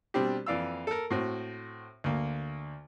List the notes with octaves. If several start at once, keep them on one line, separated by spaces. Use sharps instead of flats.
B2 G3 C4 D4 G4
F2 E3 D5 F5 E6
A4 A#4
A2 C4 F#4
D2 A#3